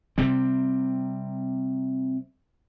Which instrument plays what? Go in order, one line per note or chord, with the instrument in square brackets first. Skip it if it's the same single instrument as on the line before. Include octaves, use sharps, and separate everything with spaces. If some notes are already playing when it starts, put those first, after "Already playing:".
[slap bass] C3 G3 C4